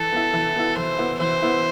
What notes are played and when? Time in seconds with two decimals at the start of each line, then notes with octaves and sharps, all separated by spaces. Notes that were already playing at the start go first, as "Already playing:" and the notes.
Already playing: E3 A4
0.13 B3 E4
0.33 E3
0.56 B3 E4
0.76 E3 C5
0.98 B3 E4
1.20 E3 C5
1.42 B3 E4